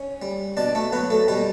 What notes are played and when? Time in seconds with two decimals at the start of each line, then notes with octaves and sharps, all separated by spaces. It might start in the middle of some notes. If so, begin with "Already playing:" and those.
Already playing: C#4 C#5
0.22 G3
0.57 B2 D4 D5
0.75 A3 A4
0.92 F#3 B3 B4
1.10 A3 A4
1.28 B2 G3 G4